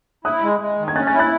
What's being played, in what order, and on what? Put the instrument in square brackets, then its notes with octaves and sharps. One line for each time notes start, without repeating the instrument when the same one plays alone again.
[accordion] E4 [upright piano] D#6 F#6
[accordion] G#3
G#3
D#3
[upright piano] G#6
[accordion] C#4 [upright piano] F#6 A6
[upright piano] F#6 A6
[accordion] E4
[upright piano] F#6 A6